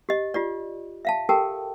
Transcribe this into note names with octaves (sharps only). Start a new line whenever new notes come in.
G4 D#5
F4 G4 D5
E5 F5 A5
G4 A4 A#4 G5 A5